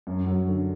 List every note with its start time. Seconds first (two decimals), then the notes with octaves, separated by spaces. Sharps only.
0.07 F#2
0.27 F#3
0.47 D3